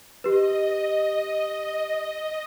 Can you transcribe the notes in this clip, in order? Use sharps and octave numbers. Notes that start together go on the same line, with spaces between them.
G4 B4 D#5